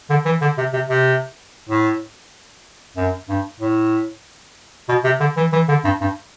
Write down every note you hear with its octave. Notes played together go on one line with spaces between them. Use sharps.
D3
E3
D3
C3
C3
C3
A2
F#2
G2
A2
B2
C3
D3
E3
E3
D3
G2
G2